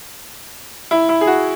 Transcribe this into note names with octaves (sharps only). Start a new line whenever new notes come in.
E4
E4
G#4
F#4